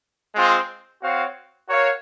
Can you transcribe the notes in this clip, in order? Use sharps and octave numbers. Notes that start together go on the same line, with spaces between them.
G#3 C4 F4
C4 F#4 C#5 F5
F#4 A#4 C#5 F5